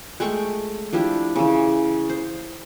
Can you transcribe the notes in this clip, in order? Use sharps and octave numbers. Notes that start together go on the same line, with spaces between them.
G#3 A3 G5 C#6
F3 D4 E4 G4
C#3 E3
C5